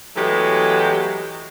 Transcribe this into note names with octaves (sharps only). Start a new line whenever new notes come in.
E3 F#3 G#3 A3 B3 G4